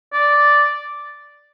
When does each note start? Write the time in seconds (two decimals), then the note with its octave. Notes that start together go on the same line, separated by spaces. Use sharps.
0.13 D5